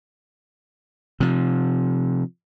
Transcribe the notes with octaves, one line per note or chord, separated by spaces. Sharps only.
C3 F3